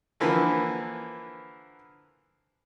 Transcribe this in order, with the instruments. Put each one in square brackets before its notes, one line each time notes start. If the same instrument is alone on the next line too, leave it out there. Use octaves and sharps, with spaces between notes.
[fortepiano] D3 E3 F3 A#3 B4